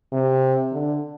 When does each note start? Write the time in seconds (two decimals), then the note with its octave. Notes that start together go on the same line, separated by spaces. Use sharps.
0.12 C3
0.72 D3